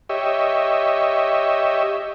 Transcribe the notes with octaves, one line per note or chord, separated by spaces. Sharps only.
G4 C#5 D#5 E5